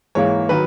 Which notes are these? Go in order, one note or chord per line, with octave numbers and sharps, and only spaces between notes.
G#2 E3 A#3 C#5
D#3 F#3 B4